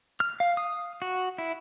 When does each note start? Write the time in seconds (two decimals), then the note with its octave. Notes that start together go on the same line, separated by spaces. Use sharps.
0.20 F6
0.40 F5
0.57 D#6
1.02 F#4
1.38 E4